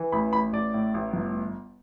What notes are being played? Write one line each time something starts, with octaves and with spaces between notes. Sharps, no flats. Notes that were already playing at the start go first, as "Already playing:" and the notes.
Already playing: E3
A1 B5
A1 B5
A1 D5
A2
A1
G1